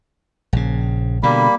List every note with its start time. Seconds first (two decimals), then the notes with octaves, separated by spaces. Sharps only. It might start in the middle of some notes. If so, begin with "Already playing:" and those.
0.53 A#1 C#3
1.23 B2 D3 G3 A#3 B5